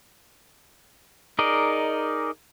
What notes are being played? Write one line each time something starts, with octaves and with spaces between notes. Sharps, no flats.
D#4 G#4 A#4 D5 D#5